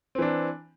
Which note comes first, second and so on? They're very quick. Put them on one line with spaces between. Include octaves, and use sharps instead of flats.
C4 E3 D4